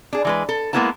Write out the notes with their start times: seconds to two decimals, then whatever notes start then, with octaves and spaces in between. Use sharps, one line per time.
0.13 D4 G#4
0.25 E3 G#3 B4
0.49 A4
0.73 G#3 A#3 B3 E4 B4 A5